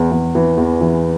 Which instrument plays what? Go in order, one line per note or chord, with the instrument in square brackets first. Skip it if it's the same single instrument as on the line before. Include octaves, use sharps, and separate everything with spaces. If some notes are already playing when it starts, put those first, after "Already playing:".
Already playing: [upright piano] E2 E3
E2
E3
E2
E3